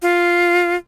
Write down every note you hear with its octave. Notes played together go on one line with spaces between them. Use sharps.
F4